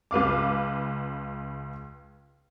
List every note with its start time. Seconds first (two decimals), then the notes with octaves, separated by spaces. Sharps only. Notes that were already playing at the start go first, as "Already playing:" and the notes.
0.11 C#2 B4 F5 D6